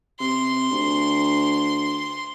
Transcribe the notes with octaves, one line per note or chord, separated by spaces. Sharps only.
C3 C6
D2